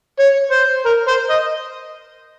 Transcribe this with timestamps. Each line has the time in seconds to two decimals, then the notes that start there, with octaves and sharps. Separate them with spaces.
0.19 C#5
0.52 C5
0.85 A#4
1.08 C5
1.30 D#5